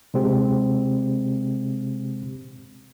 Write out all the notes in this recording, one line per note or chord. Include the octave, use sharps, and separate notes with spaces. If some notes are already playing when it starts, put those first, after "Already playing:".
C3 G#3 C4 G4